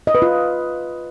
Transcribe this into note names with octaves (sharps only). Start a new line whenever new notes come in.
D#5
B4
F4